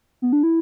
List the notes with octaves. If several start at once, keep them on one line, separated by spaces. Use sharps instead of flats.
B3
D4
E4